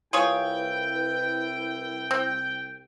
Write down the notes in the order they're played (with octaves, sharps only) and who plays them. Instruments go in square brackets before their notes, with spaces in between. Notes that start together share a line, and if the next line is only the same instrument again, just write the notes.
[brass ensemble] C2 G5 [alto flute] E4 [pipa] F4 G#4 C#5 [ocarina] B4
[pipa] C4